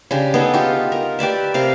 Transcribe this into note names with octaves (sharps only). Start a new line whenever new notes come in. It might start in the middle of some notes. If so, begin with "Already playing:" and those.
C#3 D4 G4
B3 D#4 G#4 A4
F4 G4
A#4
G4 B4 D5 E5
C3 A#4 F5